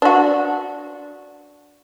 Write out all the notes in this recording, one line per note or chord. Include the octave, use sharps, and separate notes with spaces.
D4 F#4